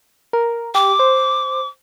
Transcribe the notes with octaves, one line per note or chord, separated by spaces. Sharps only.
A#4
G4 D6
C5